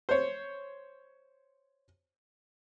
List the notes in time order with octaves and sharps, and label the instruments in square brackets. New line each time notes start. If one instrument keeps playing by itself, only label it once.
[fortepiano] C5 C#5